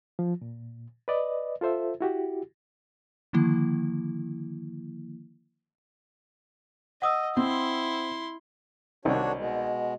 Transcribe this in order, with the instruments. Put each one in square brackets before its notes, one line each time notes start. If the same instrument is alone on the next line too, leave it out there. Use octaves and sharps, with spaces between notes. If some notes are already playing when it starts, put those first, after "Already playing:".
[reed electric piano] F3
A#2
B4 D5 D#5
F4 A4 C5 E5
E4 F#4 G4
[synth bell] D3 D#3 F3 A#3 E4
[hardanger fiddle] D#5 [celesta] F#5 D#6 E6
[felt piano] C4 [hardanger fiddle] E4 C6
[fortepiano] C2 D#3 D#4 [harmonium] D4 F#4 C#5
[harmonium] B2 G#3